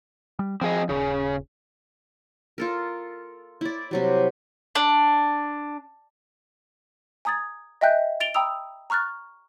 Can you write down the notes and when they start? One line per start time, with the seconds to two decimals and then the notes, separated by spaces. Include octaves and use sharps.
0.39 G3
0.61 F3 C4 G#4 D#5
0.89 D#1 C#3
2.58 F4 A4 A#4
3.61 E4 D5
3.91 C3 F#3 G3
4.75 D4
7.25 G#5 A#5 D#6 G#6 A6
7.81 D#5 E5 G5 G#5 F#6 G6
8.20 A6 D7 F7 G7
8.34 G5 A#5 B5 D#6 E6 F7
8.90 A#5 C#6 F6 F#6 A6